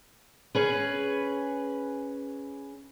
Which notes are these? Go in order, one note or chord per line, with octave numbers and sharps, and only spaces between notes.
C#4 G#4 B4